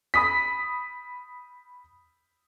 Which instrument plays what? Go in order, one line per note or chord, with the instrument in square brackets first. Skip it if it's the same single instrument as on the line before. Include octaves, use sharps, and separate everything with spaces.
[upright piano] B5 D#6 B6